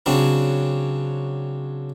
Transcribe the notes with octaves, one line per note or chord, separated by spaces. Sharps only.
C#3 F#3 C4 D4